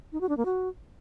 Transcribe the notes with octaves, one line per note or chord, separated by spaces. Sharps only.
D#4
F#4
D4
A#3
F#4